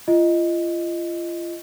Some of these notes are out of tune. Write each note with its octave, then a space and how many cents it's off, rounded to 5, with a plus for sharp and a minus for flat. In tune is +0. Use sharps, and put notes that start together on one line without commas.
F4 -35 D#5 +0